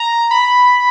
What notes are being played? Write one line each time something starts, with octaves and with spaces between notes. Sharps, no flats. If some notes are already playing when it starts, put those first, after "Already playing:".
Already playing: A#5
B5